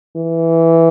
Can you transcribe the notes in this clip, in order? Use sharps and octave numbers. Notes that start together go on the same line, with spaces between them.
E3